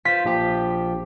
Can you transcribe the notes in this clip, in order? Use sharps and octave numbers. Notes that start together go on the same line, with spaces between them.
F4 C5 B6
A#1 F3 G4